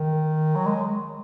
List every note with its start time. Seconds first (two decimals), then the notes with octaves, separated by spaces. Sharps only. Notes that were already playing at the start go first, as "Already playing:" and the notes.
Already playing: D#3
0.55 F#3
0.66 G#3